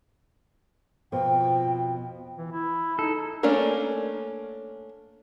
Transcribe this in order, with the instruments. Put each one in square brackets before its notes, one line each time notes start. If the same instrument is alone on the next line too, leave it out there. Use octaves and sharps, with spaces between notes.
[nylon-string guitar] F2 B2 F3 [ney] G5
[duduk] E3
E4
[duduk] D#4 [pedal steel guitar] A4
[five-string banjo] A3 A#3 C#4 D4 A#4